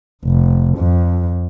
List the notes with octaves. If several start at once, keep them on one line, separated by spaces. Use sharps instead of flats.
F1
F2